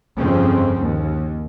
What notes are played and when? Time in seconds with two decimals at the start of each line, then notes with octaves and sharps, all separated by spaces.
0.19 G1 F2 C#3 F3 C4
0.82 D#2